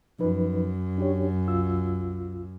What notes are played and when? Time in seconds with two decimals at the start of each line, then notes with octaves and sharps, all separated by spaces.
0.19 F#2 F3 D#4 B4
0.98 D4 G4 C#5
1.48 C2 F4 E6